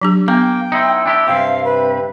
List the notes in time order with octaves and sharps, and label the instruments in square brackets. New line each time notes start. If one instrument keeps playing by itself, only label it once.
[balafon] F#3 D4 G4
[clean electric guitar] A#3 [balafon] B3 [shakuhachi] G5
[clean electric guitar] D#4 E4 C5
D4 E4 G4
[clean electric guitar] G2 C3 C4 [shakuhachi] F5
[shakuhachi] B4